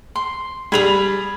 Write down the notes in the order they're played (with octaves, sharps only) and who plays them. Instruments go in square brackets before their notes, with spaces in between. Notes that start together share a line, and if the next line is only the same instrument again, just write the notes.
[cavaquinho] C6
[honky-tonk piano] G3 F7 [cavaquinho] G#4 B5 D#6